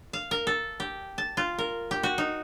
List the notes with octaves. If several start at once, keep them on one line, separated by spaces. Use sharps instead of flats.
F5
A#4
A4
G4
A5
F4
A#4
G4
F#4
D#4